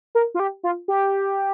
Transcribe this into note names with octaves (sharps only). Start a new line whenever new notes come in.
A#4
F4
G4
F4
G4